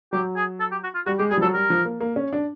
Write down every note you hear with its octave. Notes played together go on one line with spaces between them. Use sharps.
F#3 G4
G#4
A4
G4
F#4
F4
G3 F#4
G#3 G4
G3 G#4
F3
F#3 A4
G3 A#4
F3
A#3
A#3
C#4
D4